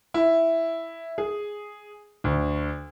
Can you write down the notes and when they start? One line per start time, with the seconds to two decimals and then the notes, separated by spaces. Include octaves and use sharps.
0.14 E4
1.18 G#4
2.24 D2